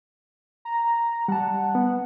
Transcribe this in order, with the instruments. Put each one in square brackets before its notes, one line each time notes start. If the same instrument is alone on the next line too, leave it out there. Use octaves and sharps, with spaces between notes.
[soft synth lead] A#5
[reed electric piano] G3 A5 [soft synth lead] F#5
[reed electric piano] B3